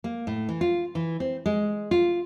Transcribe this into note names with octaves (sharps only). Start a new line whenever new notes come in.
A#3
A2
E3
F4
E3
C4
G#3
F4